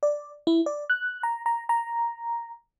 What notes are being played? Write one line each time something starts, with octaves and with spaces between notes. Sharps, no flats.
D5
E4
D5
F#6
A#5
A#5
A#5